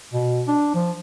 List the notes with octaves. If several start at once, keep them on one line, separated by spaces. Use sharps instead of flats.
B2
D4
F3